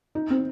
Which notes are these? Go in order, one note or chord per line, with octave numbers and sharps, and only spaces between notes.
D#4
C4